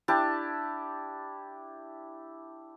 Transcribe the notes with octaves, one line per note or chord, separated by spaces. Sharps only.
D4 E4 G4 A5